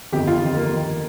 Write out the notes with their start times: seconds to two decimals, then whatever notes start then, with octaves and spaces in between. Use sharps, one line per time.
0.13 G1 F2 D#3 G4
0.27 F4
0.42 G1 F2 D#3
0.57 A#3
0.72 D#2 D#3